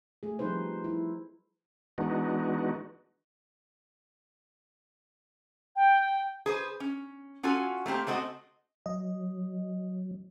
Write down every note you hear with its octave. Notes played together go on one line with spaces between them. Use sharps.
A3 G#4
F3 G3 C4 D#4 B4 C5
E4
E3 G#3 B3 D4 D#4 F#4
G5
G#4 B4 C5
C#4
C#4 F4 F#4 A4 G#5
A3 A#3 C4 G4
G#3 A3 C4 F#4 A4 D#5
F#3 D#5